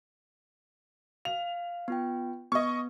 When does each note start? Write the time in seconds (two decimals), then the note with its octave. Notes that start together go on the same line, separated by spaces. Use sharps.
1.25 F5 F7
1.88 B3 F4 G5
2.52 B3 D#5 C#6